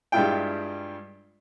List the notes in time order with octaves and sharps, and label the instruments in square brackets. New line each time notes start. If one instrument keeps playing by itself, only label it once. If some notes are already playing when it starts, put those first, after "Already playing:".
[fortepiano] G2 G3 G#3 E4 F4 G5